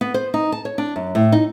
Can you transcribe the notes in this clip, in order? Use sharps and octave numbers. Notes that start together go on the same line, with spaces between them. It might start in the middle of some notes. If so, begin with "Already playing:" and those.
B3
C5
D#4
A5
C#5
D4
F#2
A2
D#4